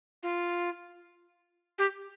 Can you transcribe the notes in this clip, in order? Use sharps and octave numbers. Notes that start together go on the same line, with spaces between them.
F4
G4